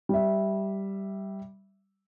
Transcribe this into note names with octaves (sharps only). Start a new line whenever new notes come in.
G3 E5